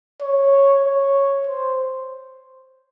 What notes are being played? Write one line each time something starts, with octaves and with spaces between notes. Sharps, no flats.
C#5
C#5
C5